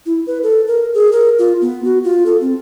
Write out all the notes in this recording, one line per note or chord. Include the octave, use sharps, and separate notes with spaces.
E4
B4
A4
A#4
G#4
A#4
F4
B3
F#4
F4
A4
C4